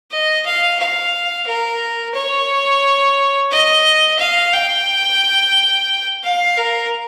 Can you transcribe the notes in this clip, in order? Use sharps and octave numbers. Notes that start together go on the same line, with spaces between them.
D#5
F5
F5
A#4
C#5
D#5
F5
G5
F5
A#4